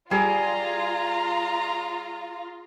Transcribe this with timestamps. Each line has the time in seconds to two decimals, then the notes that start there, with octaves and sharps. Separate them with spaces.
0.11 G3 F4 G#4 D5 A#5